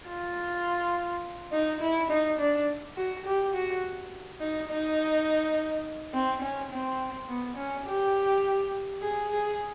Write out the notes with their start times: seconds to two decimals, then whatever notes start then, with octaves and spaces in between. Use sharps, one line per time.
0.08 F4
1.53 D#4
1.81 E4
2.10 D#4
2.38 D4
2.97 F#4
3.26 G4
3.54 F#4
4.40 D#4
4.69 D#4
6.14 C4
6.41 C#4
6.71 C4
7.28 B3
7.56 C#4
7.86 G4
9.01 G#4
9.29 G#4